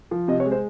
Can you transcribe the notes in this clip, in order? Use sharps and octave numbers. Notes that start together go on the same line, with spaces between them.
F3
C3 D#5
C#5
G#3
C5